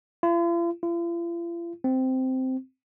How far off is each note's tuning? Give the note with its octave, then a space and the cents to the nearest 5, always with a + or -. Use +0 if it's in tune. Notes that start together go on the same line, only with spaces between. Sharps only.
F4 -45
F4 -45
C4 -10